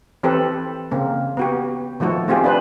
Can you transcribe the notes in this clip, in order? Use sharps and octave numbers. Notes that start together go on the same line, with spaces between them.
E3 C4 G4 A4 B4
C#3 A#3 C4
B3 F#4 G4
D#3 F3 A3 F#4 A4
A3 C4 F4 G4 G#4
D4 B4 C5